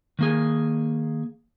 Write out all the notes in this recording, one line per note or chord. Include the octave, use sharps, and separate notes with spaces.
D#3 A#3 G#4